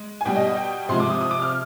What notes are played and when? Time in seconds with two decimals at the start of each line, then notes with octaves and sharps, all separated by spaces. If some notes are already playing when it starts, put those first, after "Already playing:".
Already playing: G#3
0.21 G#5
0.25 B2 G3 G5
0.36 D#5
0.47 D#5
0.57 G5
0.89 C3 F3 G#3 C6
1.00 D6
1.10 D#6
1.21 D#6
1.31 D6
1.42 F6